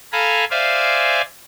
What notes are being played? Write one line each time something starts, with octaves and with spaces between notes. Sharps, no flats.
A4 F5 G#5 A#5 B5
C5 D5 E5 F5 G#5